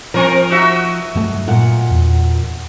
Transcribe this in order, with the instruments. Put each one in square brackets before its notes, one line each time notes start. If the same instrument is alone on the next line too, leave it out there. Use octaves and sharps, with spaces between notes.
[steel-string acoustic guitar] F3 [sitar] C4 A#4
[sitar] D#4 F#4 E5
[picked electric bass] G2 F#3 A3
[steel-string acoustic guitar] A#2 F#5
[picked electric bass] E2